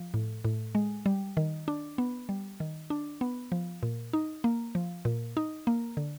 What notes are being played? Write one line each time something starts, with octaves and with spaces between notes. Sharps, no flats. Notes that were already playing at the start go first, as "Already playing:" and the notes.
Already playing: F3
A2
A2
G#3
G3
D#3
D4
B3
G3
D#3
D4
B3
F3
A#2
D#4
A#3
F3
A#2
D#4
A#3
D3